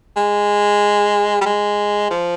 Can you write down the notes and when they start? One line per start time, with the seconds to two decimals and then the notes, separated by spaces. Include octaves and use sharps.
0.16 G#3
1.41 G3
1.46 G#3
2.10 F3